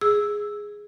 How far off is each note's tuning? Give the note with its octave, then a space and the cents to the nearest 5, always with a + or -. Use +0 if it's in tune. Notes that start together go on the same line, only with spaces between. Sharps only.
G#4 +0 E6 +0